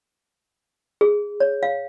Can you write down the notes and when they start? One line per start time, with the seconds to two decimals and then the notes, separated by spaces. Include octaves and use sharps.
1.01 G#4
1.40 C#5
1.63 F5